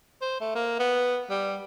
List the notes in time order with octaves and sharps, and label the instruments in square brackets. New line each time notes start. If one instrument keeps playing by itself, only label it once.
[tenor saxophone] C5
A3
A#3
B3
G3